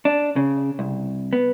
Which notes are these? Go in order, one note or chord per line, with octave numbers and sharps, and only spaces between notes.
D4
C#3
C2
B3